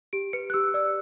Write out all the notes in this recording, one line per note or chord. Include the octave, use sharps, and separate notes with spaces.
G4 D7
B4 C#7
F#6
G4 E6
D5 E6